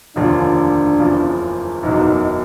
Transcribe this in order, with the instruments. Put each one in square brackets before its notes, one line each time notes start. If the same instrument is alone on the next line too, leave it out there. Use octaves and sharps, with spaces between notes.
[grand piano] F1 D#2 D3 F3 [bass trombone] D4
[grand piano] F#1 E2 C#3 F3
[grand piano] F#1 E2 B2 F#3 [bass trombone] D#4